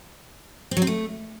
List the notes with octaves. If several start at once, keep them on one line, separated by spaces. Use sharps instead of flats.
C4
F#3
C4
A3